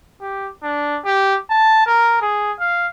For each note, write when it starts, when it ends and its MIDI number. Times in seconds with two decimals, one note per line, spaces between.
0.21 0.49 67
0.63 0.98 62
1.05 1.36 67
1.50 1.85 81
1.86 2.17 70
2.21 2.52 68
2.60 2.87 77